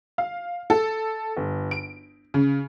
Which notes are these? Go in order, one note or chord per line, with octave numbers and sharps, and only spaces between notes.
F5
A4
G1
D7
C#3